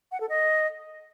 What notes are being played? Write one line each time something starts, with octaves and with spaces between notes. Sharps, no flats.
F#5
A4
D#5